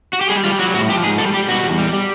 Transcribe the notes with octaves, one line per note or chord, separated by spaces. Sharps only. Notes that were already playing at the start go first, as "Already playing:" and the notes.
F#4
G4
G3 G#4
G3 F4
F#3 F#4
A2 F#4
F3 G4
G#2 G#4
G3 A4
G3 G4
B2 F#4
E2
G3
G3